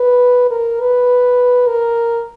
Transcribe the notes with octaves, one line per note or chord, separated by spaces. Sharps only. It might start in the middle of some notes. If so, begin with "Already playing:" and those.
Already playing: B4
A#4
B4
A#4